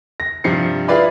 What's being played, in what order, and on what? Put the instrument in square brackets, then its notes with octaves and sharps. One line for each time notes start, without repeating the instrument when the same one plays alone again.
[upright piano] A#6
G2 C3 F3 C7 C#7
E4 F4 G#4 B4 D5 B5